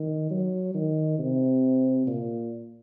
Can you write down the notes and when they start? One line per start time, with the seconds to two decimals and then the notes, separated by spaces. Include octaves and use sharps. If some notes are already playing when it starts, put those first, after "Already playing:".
Already playing: D#3
0.30 F#3
0.75 D#3
1.19 C3
2.07 A#2